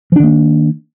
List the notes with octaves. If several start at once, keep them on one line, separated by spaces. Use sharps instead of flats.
D#3 F3 A#3 D4